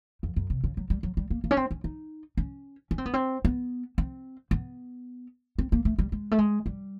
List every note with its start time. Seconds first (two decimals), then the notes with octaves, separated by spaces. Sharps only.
0.23 F2
0.36 F#2
0.50 C3
0.64 C#3
0.77 F#3
0.90 G3
1.03 F#3
1.17 G3
1.30 A#3
1.44 A#3
1.51 C#4
1.57 C4
1.71 C#4
1.84 D#4
2.37 C#4
2.91 C#4
2.98 C4
3.06 B3
3.14 C4
3.45 B3
3.98 C4
4.51 B3
5.59 C4
5.72 A#3
5.85 A3
5.99 G3
6.12 G#3
6.31 A3
6.38 G#3
6.66 G3